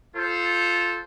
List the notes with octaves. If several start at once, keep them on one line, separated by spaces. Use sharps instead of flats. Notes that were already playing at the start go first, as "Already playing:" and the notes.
F4 A4 C5